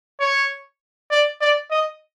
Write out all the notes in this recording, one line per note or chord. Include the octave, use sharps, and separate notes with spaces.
C#5
D5
D5
D#5